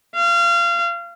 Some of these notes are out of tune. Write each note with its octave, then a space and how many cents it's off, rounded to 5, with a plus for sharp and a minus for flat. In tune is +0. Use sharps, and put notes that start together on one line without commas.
F5 -25